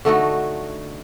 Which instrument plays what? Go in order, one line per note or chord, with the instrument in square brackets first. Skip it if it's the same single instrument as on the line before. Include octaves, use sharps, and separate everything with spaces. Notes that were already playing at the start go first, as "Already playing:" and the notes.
[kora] D3 A3 D#4 F#4